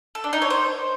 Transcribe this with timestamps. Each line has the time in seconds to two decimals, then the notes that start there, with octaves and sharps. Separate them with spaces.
0.15 A4
0.24 D4
0.33 D#4
0.42 C#5
0.50 C5